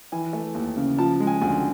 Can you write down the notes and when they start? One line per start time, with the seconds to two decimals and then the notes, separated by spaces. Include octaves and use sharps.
0.12 E3 G#5
0.33 A3
0.55 D#2
0.77 C#3
0.98 F3 A5
1.20 G#3
1.27 G#5
1.41 D2 G#5